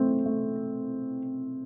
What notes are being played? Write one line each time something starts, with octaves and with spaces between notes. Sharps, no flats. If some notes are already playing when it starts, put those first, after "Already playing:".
Already playing: A3 C4
A3